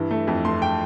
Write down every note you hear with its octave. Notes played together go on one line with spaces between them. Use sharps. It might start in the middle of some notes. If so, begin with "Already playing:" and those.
Already playing: G2 E3
A3
F2
A3 C6
G5